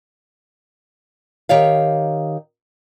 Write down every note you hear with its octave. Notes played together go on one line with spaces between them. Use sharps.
D#3 G4 C#5 F5